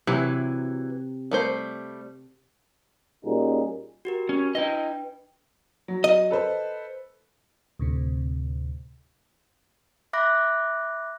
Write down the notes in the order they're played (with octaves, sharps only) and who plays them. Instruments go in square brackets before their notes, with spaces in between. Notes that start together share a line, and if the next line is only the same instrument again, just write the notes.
[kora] C3 [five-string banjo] E3 F#3
[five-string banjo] G3 A3 C5
[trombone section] A#2 G3 C#4 D#4 F#4 G#4
[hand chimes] F#4 G4 A#4
[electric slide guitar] C#4
[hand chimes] D4 B4 G5 [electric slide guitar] E4 D#5
[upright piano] F#3
[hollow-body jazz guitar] D#5
[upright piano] A4 B4 C5
[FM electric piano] D2 A2 C3
[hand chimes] E5 B5 D6 F#6 A#6